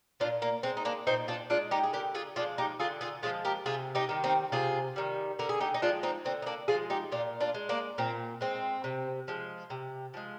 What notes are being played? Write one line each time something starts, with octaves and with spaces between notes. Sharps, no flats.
A#2 D4 F4
A#3
G#3 C4
D#4
A#3 D4
A#2 C4 D#4
D4 F4
G#3 D4 F4
D#4 G4
G#4
D3 G4 A#4
F4 G#4
F3 G#3 D4 F4
D#4 G4
D3 F4 G#4
F4 G#4
F3 G#3 F4 G#4
G4 A#4
C3 F4 G#4
D#4 G4
D#3 G3
C4 D#4
C3 F4 G#4
D#3 G3
D3 A#4
G#4
D#4 G4
D#4
F3 G#3 D4 F4
C4 D#4
D3 C4
D#4
A#3 D4
F3 G#3 F4 G#4
D#4 G4
A#2 D4 F4
D4 F4
G#3
A#3 D4
A#2 C4
G#3 C4
C3
F3 G#3
C3
F3 G#3